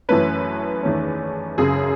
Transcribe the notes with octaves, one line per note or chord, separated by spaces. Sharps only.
F#2 E3 A3 C#4 B4
E2 D#3 A3 C#4
F#1 F#2 C#3 G#4